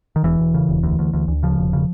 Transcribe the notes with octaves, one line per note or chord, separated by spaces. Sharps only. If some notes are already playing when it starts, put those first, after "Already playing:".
D#3
E1 E3
E1
C#3
E1
D2
D2
D2
D2
C#3 F3
E1
C#3